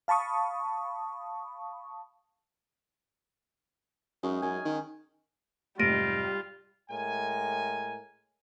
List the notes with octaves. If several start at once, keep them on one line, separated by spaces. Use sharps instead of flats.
F5 A5 B5 C#6 D#6
F#2 G#3 C#4 D#4
F#2 G#5
D#3
F1 G#2 G3 F4 G4 A#6 D7 D#7
A2 G#3 A#4 G#5